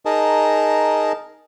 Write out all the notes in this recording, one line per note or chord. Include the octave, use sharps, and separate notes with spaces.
D#4 G#4 A#4 D#5 A5